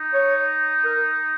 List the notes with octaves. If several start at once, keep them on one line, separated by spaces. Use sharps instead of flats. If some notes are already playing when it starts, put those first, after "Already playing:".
Already playing: D#4
C#5
A#4